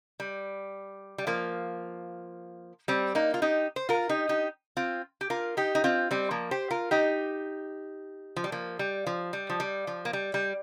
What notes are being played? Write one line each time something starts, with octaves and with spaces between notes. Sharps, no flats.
G3
G3
F3 A#3
G3 C4
A#3 D#4
F4
D#4 G4
C5
F4 A#4
D#4 G4
D#4 G4
C4 F4
G4
F4 A#4
D#4 G4
D#4
C4 F4
G3 C4
F3 A#3
G4 C5
F4 A#4
D#4 G4
F3
G3
F3 A#3
G3
F3
G3
F3
G3
F3
A#3
G3
G3